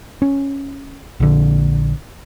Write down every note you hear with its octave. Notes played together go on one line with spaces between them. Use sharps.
C#4
A#1 D3